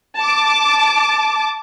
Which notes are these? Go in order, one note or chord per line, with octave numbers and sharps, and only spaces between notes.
A5 D6